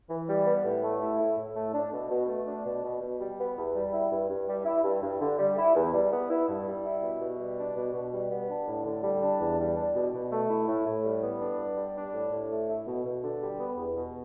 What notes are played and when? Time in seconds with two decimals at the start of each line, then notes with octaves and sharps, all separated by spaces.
0.10 E3
0.28 G3
0.46 B3
0.65 A2
0.83 A3
1.01 E4
1.19 A2
1.38 A2
1.56 A3
1.74 D4
1.93 B2
2.11 B2
2.29 A3
2.47 D4
2.66 B2
2.84 B2
3.02 B2
3.20 G3
3.39 B3
3.57 E2
3.75 G3
3.93 E4
4.12 G2
4.30 G2
4.49 G3
4.66 E4
4.84 G2
5.02 G2
5.21 D3
5.39 G3
5.58 E4
5.76 E2
5.94 G3
6.12 B3
6.30 E4
6.48 G2
6.66 G3
6.85 E4
7.03 B2
7.21 B2
7.39 G3
7.58 D4
7.77 B2
7.94 B2
8.13 G3
8.31 B3
8.49 D4
8.67 A2
8.86 D3
9.04 G3
9.22 D4
9.40 E2
9.59 G3
9.76 D4
9.95 B2
10.13 B2
10.32 A3
10.50 E4
10.68 A2
10.87 A2
11.05 G3
11.23 B3
11.41 D4
11.58 G2
11.77 G3
11.96 D4
12.14 A2
12.32 A2
12.51 A3
12.68 E4
12.87 B2
13.06 B2
13.23 D3
13.41 G3
13.60 B3
13.77 E2
13.96 B2